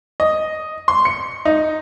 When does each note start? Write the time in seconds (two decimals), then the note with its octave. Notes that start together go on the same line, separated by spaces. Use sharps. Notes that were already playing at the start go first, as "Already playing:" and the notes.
0.20 D#5
0.88 C6
1.05 C#7
1.45 D#4